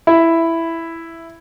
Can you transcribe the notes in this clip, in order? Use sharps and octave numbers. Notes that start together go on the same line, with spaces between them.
E4